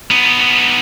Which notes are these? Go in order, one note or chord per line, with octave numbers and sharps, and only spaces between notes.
B3 D#4